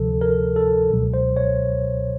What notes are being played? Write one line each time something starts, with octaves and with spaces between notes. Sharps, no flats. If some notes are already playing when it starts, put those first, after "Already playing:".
Already playing: D2 C3 F3 A4
A#4
A4
C#2 B2 F#3
C5
C#5